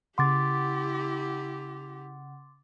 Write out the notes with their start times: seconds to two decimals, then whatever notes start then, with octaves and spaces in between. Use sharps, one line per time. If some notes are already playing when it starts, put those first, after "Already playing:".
0.18 C#3 E4 G4 F#5 C6 D6 A6